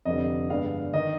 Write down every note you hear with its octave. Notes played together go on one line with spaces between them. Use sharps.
F1 F2 D3 G3 D#5
G2 D3 G#3 B3 D4 F5
D#3 D#5